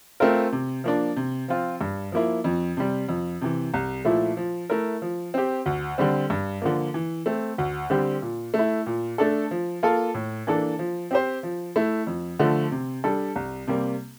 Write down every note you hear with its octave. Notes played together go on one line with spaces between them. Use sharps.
A3 C4 F4 A#4
C3
F3 A#3 D4
C3
F3 C4 F4
G2
F3 A#3 E4
F2
C3 G3
F2
C3 E3
C2
A#2 F3 A3 E4
F3
A3 E4 A#4
F3
C4 G4
D2
D3 G3 C4
G2
D3 F3 A#3
E3
A3 C4
D2
D3 G3 C4 G4
A#2
A3
E4
A#2
A3 D4 A4
F3
A#3 F4 A4
A2
E3 A#3 D4 A4
F3
C4 G4 C5
F3
A3 E4
F2
D3 F3 A3
C3
G3 D4 A4
C2
C3 G3 A#3